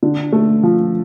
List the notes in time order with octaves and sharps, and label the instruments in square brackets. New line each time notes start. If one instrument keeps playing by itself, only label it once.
[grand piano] D3
A3
F3